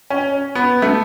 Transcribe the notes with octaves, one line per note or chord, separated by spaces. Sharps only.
C#4
B3
A3